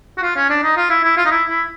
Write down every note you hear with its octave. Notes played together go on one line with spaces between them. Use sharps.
F#4
F4
C#4
D4
D#4
F4
E4
E4
F4
D#4
E4
E4